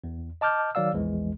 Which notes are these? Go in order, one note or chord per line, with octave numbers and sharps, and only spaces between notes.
E2
D#5 A5 D6 F6 G6
D#3 F#3 D5 F5 E6
A#1 E2 E3 G#3